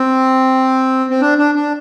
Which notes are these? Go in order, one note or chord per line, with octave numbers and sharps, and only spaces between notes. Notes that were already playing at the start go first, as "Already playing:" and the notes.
Already playing: C4
C4
D4
D4
D4